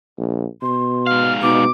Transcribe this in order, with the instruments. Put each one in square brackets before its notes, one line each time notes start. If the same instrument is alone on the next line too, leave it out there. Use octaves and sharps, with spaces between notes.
[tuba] A#1
[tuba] B2 [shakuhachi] C6
[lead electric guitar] G#2 F5 [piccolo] F6
[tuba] B2 [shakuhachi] D#4 [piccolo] D6